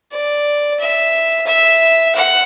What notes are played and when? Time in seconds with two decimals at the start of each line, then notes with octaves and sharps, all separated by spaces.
0.12 D5
0.80 E5
1.47 E5
2.15 F#5